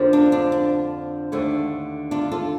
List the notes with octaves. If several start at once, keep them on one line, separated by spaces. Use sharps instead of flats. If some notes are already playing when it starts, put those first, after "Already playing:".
Already playing: F2 D3 F3 A#3
D4
D4
D4
D#2 D3 A3
D4 F4
F4 A4